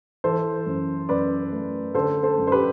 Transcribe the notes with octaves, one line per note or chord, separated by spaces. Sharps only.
E3 A4 C5
F#2
F#2 B4 D5
A3
D3 A4 C5
A4 C5
F#2
C5
G4 B4